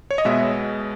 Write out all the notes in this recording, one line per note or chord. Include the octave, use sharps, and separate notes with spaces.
C#5
D#5
B2 G#3 B3 E5